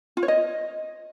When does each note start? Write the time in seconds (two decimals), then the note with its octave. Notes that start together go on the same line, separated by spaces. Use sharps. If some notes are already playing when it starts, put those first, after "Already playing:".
0.17 F4
0.23 C#5
0.28 D#5